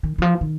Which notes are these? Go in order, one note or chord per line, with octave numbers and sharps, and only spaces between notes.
D#3
D#3
F3
D#3